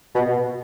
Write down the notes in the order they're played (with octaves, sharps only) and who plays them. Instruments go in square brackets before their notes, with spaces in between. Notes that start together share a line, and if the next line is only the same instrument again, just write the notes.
[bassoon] B2